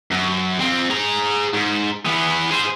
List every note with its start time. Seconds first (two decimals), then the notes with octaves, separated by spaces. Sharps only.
0.12 F#2
0.61 F2 C4
0.90 G#4 A#5
1.54 G#2
2.06 E3 B3
2.51 G#4 C5